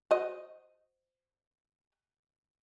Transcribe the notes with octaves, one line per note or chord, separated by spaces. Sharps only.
F#4 C5 D#5